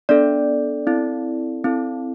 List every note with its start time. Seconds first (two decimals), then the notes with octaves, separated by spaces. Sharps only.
0.09 B3 D4 A4 D5
0.87 C4 E4 A4
1.64 C4 E4 A4